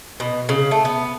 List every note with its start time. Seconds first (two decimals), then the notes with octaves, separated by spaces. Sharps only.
0.20 B2
0.49 C#3
0.71 A3
0.85 B3